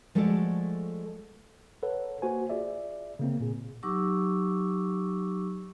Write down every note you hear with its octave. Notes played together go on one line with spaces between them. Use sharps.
F3 G#3 A3 F#4 A4 D5
A4 B4 C#5 F#5
A#3 F#4 C5 G#5
F4 G#4 D5 E5
C#3 A#3 C4
A#2 G#4
F#3 D#4 G4 C#6 D6 E6